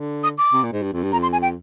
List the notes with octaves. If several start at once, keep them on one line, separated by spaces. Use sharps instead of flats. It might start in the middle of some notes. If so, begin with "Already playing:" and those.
Already playing: D3
D#6
D6
C3
A#2
G#2
G2
F2
G2
F2 A#5
C6
G#5
G5